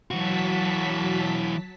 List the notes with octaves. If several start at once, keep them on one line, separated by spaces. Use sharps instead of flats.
E3 F#3 F#4 A5 B6